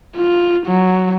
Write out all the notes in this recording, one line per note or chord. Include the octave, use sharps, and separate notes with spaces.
F4
F#3